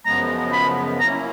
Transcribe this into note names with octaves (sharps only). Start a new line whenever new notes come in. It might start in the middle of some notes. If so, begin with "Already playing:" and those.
F#2 C#3 F3 G#3 B3 A#5
B5
F#3 A#3 C#4 E4 A#5